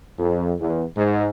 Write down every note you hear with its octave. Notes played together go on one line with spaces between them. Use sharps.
F2
E2
G#2